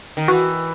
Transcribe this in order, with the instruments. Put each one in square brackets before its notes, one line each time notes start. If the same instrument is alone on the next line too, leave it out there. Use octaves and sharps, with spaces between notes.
[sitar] D#3
[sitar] E3 [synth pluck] F#4